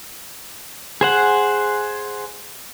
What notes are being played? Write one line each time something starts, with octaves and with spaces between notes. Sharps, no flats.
G#4 C5 F#5